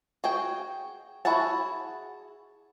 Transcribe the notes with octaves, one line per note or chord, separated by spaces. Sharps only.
F#4 G#4 G5
E4 F#4 G#4 F#5 A5